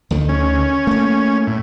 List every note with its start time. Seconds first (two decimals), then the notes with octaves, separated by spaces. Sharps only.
0.11 D2 D3 D#3
0.29 C#4
0.87 A3 A#3
1.47 A2